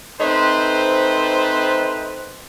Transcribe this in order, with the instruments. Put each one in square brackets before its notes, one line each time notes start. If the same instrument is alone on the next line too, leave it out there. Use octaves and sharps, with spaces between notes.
[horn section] A3 C4 D#4 B4 C5